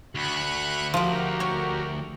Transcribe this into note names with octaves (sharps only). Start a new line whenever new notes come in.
D2 B5 C#6 F#6
F3 F#4 G4 A#4 G5
C#5